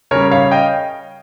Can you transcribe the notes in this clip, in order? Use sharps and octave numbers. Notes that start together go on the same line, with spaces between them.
C#3 G3 A#4 C#5
C#5 F5
D#5 G5